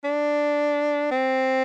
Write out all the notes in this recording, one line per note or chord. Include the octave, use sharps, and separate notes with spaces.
D4
C4